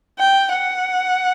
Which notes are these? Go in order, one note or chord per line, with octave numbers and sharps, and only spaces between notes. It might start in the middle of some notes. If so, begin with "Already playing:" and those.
G5
F#5